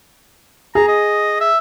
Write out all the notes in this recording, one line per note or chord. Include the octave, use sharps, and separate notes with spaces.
G#4 A#5
D#5
E5